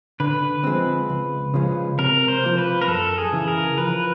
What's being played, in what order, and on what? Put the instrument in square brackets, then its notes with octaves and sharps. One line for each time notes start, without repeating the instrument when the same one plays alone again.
[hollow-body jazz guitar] D3 [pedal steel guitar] B4
[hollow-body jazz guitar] F3 G#3 C4
C#2
C#3 F3 G#3 C#4
[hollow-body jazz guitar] C3 [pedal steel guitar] A#4
[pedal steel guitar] C5
[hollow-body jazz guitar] F3 A#3
[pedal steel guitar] B4
A#4
[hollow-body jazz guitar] F#2 [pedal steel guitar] A4
[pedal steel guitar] G#4
[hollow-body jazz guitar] C#3 E3
[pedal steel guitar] A#4
[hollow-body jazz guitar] F3 [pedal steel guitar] B4